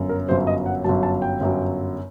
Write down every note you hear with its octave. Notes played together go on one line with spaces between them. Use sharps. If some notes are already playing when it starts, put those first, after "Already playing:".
Already playing: G1 F#2
A#4
G1 F#2 F#3 C5
D#5
F#5
G1 F#2 F#3 A5
A5
G5
G1 F#2 F#3